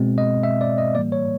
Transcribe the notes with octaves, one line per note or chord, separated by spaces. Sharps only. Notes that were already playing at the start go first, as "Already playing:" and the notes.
Already playing: B2 G#3 C4
D#5
E5
D5
D#5
A2 E3 G3 A#3 D5
C#5